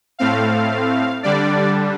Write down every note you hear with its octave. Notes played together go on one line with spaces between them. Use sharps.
A2 A3 C4 F5
D3 G3 D4 D5